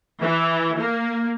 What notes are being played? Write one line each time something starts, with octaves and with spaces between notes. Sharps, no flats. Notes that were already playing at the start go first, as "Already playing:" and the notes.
E3
A#3